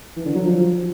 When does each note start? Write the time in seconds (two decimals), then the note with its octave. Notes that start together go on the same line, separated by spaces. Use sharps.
0.17 E3
0.26 D3
0.35 F#3
0.44 F3